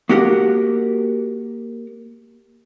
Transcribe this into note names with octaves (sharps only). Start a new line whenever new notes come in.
A#3 F#4 G4 A#4 F#5